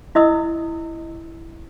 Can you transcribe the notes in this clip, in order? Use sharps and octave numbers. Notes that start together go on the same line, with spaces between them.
E4 D#5 D#6 E6